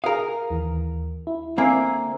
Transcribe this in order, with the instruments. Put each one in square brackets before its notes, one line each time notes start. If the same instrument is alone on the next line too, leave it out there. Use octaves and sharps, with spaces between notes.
[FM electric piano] G#4 D#6 [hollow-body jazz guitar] A#4 F5
[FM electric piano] D#2 E3
E4
[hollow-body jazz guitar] D3 A#3 C4 [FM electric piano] E5 G#5 D6